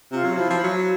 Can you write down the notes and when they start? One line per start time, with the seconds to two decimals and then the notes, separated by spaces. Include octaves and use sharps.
0.12 C3 F4
0.25 F#3
0.37 F3 E4
0.50 F3
0.64 F#3